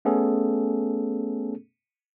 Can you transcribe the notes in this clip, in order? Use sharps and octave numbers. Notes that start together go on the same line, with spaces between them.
A3 B3 C#4 G#4 A4